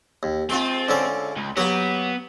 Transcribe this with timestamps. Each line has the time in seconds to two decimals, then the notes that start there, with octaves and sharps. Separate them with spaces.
0.23 D#2
0.50 G#3 C4 F4 G5
0.89 D3 C#4 A4
1.36 C#2
1.57 F#3 A#3 B3 F#4 G4